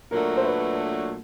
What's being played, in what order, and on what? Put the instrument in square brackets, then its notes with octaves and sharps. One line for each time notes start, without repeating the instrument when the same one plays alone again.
[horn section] A#2 F#3 A3 D4 F#4 [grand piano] A#4
[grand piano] C5
B4